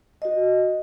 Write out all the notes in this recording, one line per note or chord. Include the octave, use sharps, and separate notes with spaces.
F#4 D#5